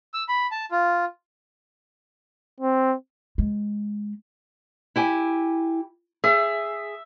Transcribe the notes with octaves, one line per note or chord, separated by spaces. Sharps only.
E6
B5
A5
F4
C4
G#3
E4 G4 G#5
G#4 E5